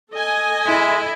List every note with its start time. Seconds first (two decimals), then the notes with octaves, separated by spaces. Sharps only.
0.13 A4 D#5 G#5
0.67 G#3 E4